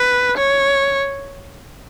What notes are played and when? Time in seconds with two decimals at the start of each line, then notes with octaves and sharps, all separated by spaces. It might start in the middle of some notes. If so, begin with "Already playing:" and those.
Already playing: B4
0.37 C#5